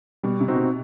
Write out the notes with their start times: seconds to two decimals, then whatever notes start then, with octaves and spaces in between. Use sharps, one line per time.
0.23 B2 G3
0.40 C3
0.48 C4 D#4 F#4
0.56 B2